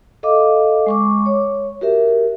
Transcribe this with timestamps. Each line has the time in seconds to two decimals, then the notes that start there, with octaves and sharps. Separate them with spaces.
0.23 A4 D#5 F5 D6
0.86 G#3 C#6 D6
1.26 C#5
1.81 F#4 G4 A#4 E5